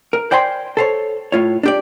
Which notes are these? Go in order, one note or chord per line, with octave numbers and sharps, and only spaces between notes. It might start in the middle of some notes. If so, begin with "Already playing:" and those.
A#4
C5 D5 G5 G#5 A#5 C6
A4 C5 C#5
A2 F4 C#5
D4 G4 D5